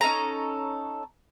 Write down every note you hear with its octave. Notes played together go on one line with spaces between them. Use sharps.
C#4 D#4 A4 A#5